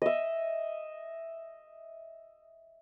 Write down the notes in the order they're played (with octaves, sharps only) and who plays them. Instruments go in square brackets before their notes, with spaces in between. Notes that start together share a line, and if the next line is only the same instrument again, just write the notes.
[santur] D#5 E5